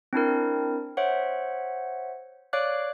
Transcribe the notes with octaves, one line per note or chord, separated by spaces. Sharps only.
C4 D4 E4 A#4
C5 C#5 E5 F#5
C#5 D5 F5 D6 F#6